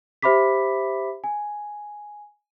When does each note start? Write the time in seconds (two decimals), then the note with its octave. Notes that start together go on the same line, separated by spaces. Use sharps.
0.22 G4 C5 E5 B5 D6 B6
1.24 G#5